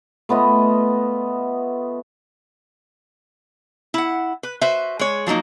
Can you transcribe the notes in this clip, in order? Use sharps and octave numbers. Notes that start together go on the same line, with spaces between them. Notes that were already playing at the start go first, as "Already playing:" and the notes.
A3 B3 F4 D#5
E4 F#5
B4
F#4 B4 C5 E5
G#3 C#5
F3 F#3 A#3 D#4